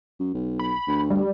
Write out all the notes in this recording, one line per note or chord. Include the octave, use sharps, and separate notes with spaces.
F#2
B1
B5
D2
G3